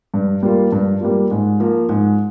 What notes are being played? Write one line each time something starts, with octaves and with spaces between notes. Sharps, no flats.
G2
G3 A#3 F4
G2
G3 A#3 F4
G#2
F3 A#3
G#2